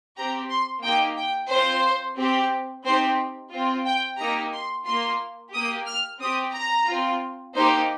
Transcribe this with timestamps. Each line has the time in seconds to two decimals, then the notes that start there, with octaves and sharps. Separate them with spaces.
0.17 C4 G4 A#5
0.51 C6
0.84 A#3 D#4 G4 G5
1.18 G5
1.51 C4 F4 C5
2.18 C4 G4
2.86 C4 D#4 G4 C5
3.52 C4 F4
3.86 G5
4.19 A#3 D#4 G4 A#5
4.54 C6
4.86 A#3 F4 C6
5.54 A#3 G4 D#6
5.87 F6
6.20 C4 G4 D#6
6.54 A#5
6.88 C4 F4
7.55 A#3 D#4 G4 C5